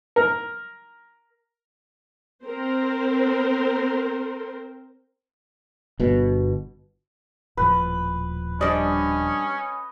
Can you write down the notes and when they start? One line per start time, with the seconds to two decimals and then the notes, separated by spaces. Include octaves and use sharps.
0.16 A#4
2.44 C4 A#4 C5
5.99 G1 B2
7.57 D#1 A2 F3 B4
8.61 G3 C#4 D4 D#5